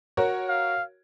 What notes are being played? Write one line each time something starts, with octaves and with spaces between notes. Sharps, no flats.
F#4 A#4 C#5
F5